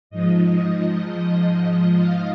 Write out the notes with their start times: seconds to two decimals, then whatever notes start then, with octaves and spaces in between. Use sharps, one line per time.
0.10 G#2 F3 D#5
1.95 F5